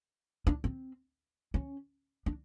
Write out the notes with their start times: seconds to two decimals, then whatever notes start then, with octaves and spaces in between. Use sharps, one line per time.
0.47 D4
0.64 C4
1.54 C#4
2.26 D4